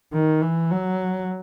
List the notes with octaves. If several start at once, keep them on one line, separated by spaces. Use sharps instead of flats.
D#3
E3
F#3